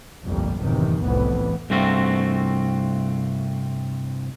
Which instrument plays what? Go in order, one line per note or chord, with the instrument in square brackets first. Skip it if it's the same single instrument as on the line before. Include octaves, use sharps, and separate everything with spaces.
[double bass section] G1 C2 F2 A#2 G3
F#1 E2 A2 C3 D#3 E3
F1 C2 F2 A2 E3 B3
[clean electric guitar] C2 G2 A3 C4 F4 F#4